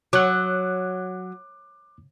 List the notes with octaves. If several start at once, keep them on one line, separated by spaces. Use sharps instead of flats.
F#3 D6 F#6